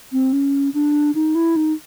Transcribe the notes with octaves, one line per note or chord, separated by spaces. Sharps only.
C4
C#4
D4
D#4
E4
D#4